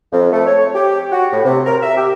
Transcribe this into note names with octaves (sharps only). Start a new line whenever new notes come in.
F2
A3
C#5
G4
F#4
A2
C3
A#4
E5
G4